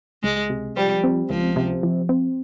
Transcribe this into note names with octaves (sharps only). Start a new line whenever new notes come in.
C#2 G#3
C3
F3 G3
C4
C#2 F3
C3
F3
C4